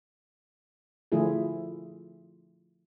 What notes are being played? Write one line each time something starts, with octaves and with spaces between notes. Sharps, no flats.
D3 F3 A3 E4 F4 G#4